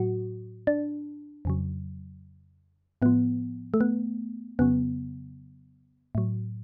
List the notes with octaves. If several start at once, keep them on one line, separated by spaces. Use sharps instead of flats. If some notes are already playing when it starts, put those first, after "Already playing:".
Already playing: A2 F#3 F#4
D4
F2 C#3 F#3
A2 F3 B3
A3
B3
F2 C#3 F#3 B3
A2 F#3